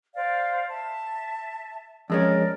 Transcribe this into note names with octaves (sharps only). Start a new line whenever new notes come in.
C5 D5 F5
E5 A5
F2 G#3 C#4 A#4 D5